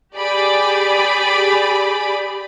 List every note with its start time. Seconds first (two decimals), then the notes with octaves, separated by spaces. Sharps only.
0.17 G4 G#4 D5 B5